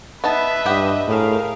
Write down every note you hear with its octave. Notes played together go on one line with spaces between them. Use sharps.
B3 D#4 B4 E5 A5
G2 G4 D#5 F#5
A2 G#4 A#4 F5